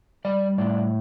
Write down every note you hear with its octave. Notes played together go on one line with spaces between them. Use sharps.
G3 D5
A2 D5